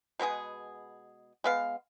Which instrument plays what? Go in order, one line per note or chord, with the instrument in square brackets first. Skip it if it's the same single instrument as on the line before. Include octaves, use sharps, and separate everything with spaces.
[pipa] B2 G#3 B3 G#4
G#3 B3 F5